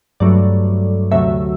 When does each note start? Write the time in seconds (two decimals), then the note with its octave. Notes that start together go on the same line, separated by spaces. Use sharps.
0.20 G2 F#3 A3 D5
1.11 D2 C3 F#3 A3 E5